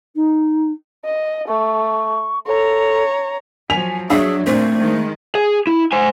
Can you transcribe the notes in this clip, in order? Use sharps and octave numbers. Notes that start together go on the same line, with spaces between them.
D#4
D#5
A3 C#6
A4 C#5 A#5
F3 F#3 G#5 B6 F7
F#3 D4 G#4 E5
A#2 A3 C4 D4
D#3 G#3
G#4
E4
C5 G#5